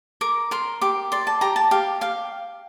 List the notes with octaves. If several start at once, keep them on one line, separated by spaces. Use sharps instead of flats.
A#4 D6
A#4 C6
G4 D6
D5 C6
A5
G4 A#5
A5
G4 F5
G4 F5